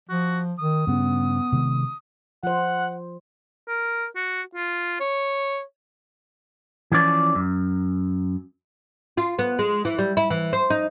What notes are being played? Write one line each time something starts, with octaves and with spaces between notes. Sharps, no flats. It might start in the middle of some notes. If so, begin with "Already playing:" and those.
F3 F#4
D#3 D#6
G2 C#3 B3
C3 D#3 G#3
F3 C5 F#5
A#4
F#4
F4
C#5
E3 F3 C#4 D5
F#2
F4
B3
G#3
E3
G3
E4
E3
C5
D#4